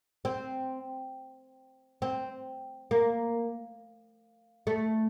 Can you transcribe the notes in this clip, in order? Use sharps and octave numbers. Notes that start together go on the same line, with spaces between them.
C4
C4
A#3
A3